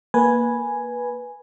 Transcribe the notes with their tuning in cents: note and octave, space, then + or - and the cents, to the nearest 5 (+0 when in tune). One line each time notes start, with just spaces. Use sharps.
A#3 +0 B4 -10 G#5 +0